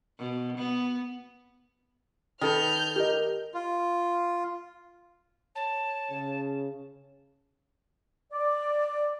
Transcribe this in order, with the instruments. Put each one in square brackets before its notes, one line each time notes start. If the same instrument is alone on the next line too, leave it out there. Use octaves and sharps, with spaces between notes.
[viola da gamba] B2
B3
[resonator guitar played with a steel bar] D#3 A4 B4 [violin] F6 G6
[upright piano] G4 A#4 D#5
[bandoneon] F4
[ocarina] C#5 [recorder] A5
[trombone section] C#3
[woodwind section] D5